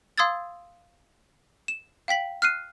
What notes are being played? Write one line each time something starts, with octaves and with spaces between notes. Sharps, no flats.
F5 C6 D#6 E6 G#6 A6
E7
F5 G5 B6 F#7
F6 F#6 C7 D#7